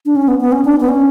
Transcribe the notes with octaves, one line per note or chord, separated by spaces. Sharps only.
D4
C#4
B3
B3
C#4
D4
B3
C#4